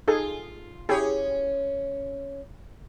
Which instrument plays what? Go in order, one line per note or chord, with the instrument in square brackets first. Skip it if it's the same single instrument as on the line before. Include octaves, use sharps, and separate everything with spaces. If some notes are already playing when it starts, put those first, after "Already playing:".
[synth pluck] D#4 G#4 A4 [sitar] F4
[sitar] C#4 C#5 [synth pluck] E4 G4 G#4